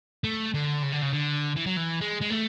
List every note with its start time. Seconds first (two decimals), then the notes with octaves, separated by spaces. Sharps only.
0.24 A3
0.54 D3
0.83 C#3
0.92 D3
1.02 C#3
1.13 D3
1.56 E3
1.66 F#3
1.76 E3
2.01 G#3
2.21 G#3
2.30 A3